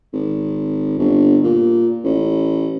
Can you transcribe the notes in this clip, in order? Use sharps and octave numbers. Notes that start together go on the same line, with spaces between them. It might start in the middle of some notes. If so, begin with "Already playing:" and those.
G#1
G1
A#2
A1